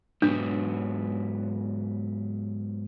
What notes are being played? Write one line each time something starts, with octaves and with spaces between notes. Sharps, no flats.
G#2 F#3 B3 D4